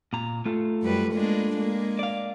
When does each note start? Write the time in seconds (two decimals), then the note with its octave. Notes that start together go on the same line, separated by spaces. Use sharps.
0.13 A#2 A#5
0.45 A3 F4
0.83 F#2 G3 B4
1.14 G#3 A#3 D4
1.56 G#3 A#3
1.99 D5 F5